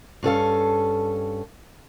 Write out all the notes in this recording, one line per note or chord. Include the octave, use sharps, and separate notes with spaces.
G2 C#4 A4 F5